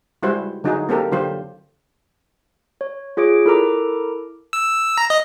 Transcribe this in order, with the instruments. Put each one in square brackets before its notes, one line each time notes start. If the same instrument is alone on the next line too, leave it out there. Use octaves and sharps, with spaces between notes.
[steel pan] G3 G#3 E4 F#4 C5
D3 F#3 D#4 E4 F#4 G#4
A#3 C4 G4 A4 A#4
D3 F#3 F4 G4 C5
[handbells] C#5
F4 G#4 C#5 D6 D7
E4 A4 A#4 A#5 D6
[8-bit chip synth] E6
A#5
D#5